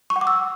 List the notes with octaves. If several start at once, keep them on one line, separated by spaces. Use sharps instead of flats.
C#6
F#5
D6
E6